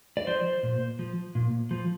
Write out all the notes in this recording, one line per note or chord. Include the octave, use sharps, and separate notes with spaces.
D5
F3 C5
A#2
F3
A#2
F3